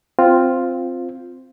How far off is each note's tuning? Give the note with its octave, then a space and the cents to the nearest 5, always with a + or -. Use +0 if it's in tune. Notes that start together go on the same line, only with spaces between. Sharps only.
C4 +0 F4 +0